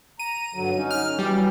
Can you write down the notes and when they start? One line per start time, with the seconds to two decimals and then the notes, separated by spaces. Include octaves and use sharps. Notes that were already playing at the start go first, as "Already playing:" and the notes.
0.19 A#5 D#7
0.54 G2 D3 F#3
0.75 C#4 D#4
0.91 F6
1.19 E3 F#3 G3